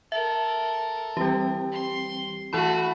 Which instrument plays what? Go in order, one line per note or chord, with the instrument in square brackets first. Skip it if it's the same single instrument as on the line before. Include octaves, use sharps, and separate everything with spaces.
[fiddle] A4 A#4 [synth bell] E5
[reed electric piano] E3 C4 G5 [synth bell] G3 G4
[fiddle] C6
[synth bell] E3 E4 B5 [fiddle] A3 F#4